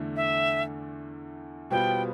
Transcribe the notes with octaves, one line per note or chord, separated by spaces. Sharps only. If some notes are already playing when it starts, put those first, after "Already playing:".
Already playing: E2 D3 A3
E5
B2 G3 B3 F4 C5 G5